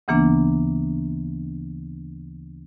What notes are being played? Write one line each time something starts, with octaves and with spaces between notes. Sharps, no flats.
D2 C#3 E3 A#3 B3 D4